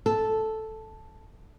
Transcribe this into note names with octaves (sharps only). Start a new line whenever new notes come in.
A4